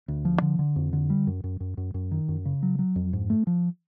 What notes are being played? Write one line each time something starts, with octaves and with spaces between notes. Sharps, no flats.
D2
F3
D3
D3
F2
D3
G3
F#2
F#2
F#2
F#2
F#2
D#3
F#2
C#3
F#3
F#3
F2
G#2
A3
F3